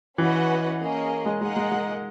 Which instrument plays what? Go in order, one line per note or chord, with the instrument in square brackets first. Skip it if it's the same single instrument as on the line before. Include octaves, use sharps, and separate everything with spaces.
[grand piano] E3 [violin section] C#4 F#4 B4 D#5 F#5
[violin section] A#3 C#4 G#4 D#5
[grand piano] G#3
[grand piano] G#3 [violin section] A#3 D#4 G#4 D#5 F#5
[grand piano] G#3
G#3